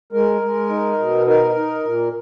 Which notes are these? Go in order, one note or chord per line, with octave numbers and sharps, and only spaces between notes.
G#3 A#4
G#3
D#4
B2
D#4 A#4
D#4
A#2